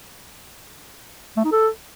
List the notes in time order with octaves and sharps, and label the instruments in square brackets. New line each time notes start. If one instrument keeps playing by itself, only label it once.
[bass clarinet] A3
D#4
A4